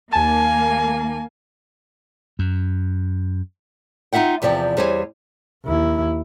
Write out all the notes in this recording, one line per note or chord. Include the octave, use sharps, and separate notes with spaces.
D#2 A#3 G#5 A5
F#2
D#4 F4 E5 F#5 G5
E2 C3 F3 D5 G5
E2 G3 C5 C#5 G#5
D#2 E4